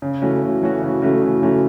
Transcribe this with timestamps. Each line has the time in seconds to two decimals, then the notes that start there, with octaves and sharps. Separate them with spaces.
0.02 C#3
0.22 E3 A3 C#4 F#4
0.42 C#3
0.61 E3 A3 C#4 F#4
0.82 C#3
1.02 E3 A3 C#4 F#4
1.22 C#3
1.42 E3 A3 C#4 F#4